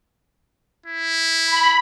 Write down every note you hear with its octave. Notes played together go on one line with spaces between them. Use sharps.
E4
B5